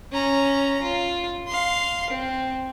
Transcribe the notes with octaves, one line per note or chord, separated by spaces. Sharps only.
C#4 A#5
F4
F5 C6
C4